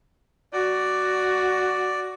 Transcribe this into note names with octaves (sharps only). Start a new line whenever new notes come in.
F#4 D5